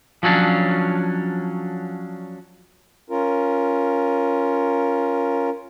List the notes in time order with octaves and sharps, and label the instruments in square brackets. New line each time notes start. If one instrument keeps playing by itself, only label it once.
[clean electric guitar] F3 F#3 C#4 D4
[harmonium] C#4 F4 A#4